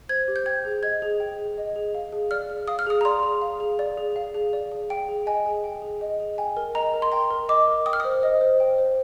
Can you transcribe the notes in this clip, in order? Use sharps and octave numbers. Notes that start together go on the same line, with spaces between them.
C5 G#6
G4
G6
G5 G#6
G#4
D#5 G#6
G#4
G5
G#4
D#5
G#4
F5
G#4
D5 F6
G#4
F5 D#6
F6
G#4 D#6
A#5
D5 C6
G#4
F5
G#4
D5
G#4
F5
G#4
D5
G#4
G5
G#4
D#5 G#5
G#4
G5
G#4
D#5
G#4
G5 G#5
A#4
D#5 A#5
A#4
C6
G5 A#5
A#4
D#5 D6
A#4
G5 D#6
F6
C5 D#6
D#5
C5
G5
C5